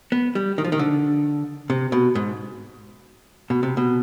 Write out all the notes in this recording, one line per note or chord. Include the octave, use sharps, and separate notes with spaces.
B3
G3
D#3
F3
D#3
D3
C3
B2
G#2
B2
C3
B2